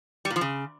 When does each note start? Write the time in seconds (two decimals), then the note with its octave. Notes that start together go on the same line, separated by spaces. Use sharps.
0.25 G3
0.30 A#2
0.36 F3
0.41 C#3